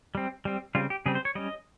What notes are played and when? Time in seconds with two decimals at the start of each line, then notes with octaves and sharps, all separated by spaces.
0.15 G3 C4
0.45 G3 C4
0.75 C#3 G3 C4 F4
0.90 G4
1.06 C#3 G3 C4 G#4
1.15 C5
1.25 C#5
1.35 G3 C#4 D#5